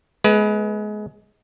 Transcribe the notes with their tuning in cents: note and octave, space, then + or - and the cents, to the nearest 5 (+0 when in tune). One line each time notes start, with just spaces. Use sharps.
G#3 +25 B3 -10 B4 -5